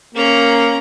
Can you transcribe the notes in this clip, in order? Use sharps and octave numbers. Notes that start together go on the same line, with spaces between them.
A#3 C#4 A#5